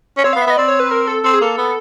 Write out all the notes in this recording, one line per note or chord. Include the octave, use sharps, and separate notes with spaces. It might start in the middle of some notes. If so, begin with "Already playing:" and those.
C#4
C4 C#5
B3 F5
E5
B3 D#5
C4 D5
C#5
B4
A#4
A4
C4 A4
G#4
A#3 A4
B3